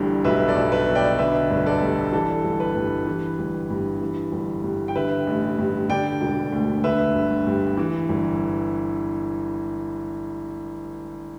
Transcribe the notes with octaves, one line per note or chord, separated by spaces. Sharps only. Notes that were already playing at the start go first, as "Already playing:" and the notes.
Already playing: G1 G2 E3 A4 D5
B1 B4 E5
A4 D5
B1
B4 E5
B2
D5 G5
D3 B4 E5
G1
B4
A4 D5
G2
E3 A4
G1
B4
G2
E3
G1
G2
E3
G1
G2
G5
D3 B4 E5
A1
G2
D3 D5 G5
E1
D2
D3 B4 E5
G1
G2
E3
G1